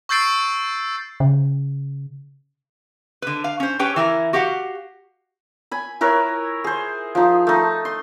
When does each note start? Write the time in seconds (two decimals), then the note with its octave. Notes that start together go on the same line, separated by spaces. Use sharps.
0.09 C#6 E6 G6 A6 C7 D7
1.20 C#3
3.22 D3 B4
3.44 F5
3.60 C#4 C5
3.79 C#4 G4 B4 C#5 G5
3.96 E3 E4 A#4
4.33 F#4 G4 F5 F#5
5.71 G#5 B5
6.01 E4 A#4 B4 C#5
6.64 G#4 C5
7.15 F3 D#4
7.47 A3 D#4
7.85 C6